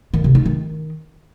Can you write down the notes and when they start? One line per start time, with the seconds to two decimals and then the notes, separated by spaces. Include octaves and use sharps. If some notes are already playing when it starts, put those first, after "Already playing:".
0.14 D#3
0.24 C3
0.35 D#4
0.46 D#3